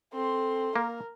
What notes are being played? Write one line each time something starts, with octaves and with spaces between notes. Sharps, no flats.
C4 A4 C6
A#3 A#4